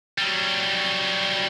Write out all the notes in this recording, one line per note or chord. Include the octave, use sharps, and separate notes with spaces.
F#3 G3